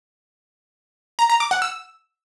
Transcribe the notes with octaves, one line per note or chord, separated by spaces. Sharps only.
A#5
A#5
D6
F#5
E6